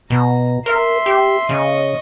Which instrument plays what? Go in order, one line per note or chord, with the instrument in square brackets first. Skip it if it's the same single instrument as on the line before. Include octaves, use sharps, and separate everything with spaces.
[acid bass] B2 [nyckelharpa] A#5
[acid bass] A#4 [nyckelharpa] E5 C6
[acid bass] G4
[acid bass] C#3 [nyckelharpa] D#5 C#6